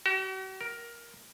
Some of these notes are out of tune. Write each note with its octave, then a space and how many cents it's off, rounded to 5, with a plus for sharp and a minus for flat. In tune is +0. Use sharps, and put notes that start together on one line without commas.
F#4 +45
A#4 +10